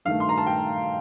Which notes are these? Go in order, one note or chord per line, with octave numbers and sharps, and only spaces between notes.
G2 D#3 A3 F5
C6
A#5
A5
G5